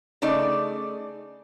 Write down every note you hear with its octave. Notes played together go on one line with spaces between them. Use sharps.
C#3 A3 D#4 D5